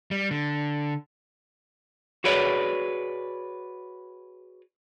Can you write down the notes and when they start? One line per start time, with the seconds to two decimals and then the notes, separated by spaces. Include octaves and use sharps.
0.11 G3
0.31 D3
2.24 F#4 G#4 B4 C#5 D5